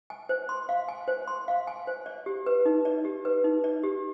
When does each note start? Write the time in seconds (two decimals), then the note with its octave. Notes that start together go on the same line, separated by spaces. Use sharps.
0.10 G#5
0.29 C5
0.49 C6
0.69 F5
0.89 G#5
1.08 C5
1.28 C6
1.48 F5
1.67 G#5
1.87 C5
2.06 D5
2.26 G4
2.46 B4
2.66 D#4
2.85 D5
3.05 G4
3.25 B4
3.44 D#4
3.64 D5
3.84 G4